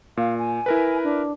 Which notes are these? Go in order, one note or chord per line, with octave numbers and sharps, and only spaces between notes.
A#2 F5
G#5
E4 A#4 B4
D4